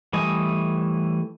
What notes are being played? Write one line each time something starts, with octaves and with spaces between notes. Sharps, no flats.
E3 G3 A3 D#5 G#5